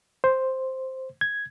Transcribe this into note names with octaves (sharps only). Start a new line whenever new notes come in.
C5
G#6